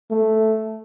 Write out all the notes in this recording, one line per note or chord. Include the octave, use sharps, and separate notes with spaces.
A3